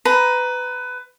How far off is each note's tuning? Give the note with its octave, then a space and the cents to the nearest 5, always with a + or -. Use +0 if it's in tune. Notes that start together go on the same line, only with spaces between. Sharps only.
B4 +20 A#5 +20